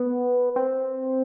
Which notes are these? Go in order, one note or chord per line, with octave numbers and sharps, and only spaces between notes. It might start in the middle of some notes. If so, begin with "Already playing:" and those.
Already playing: B3
C4